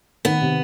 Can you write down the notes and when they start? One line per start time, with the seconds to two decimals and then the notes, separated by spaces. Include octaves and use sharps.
0.25 D#3 B3
0.41 C3